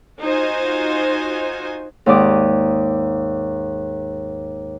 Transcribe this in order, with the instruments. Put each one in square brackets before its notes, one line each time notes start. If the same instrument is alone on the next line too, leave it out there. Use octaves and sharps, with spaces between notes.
[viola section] D#4 F4 F#4 C5 G#5
[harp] D#2 G#2 D5 D6 D#6